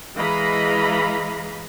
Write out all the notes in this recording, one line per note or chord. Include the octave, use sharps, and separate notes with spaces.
E3 G#3 D#5 F5 A#5 B5